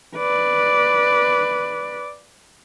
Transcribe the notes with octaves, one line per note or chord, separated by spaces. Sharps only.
B4 D5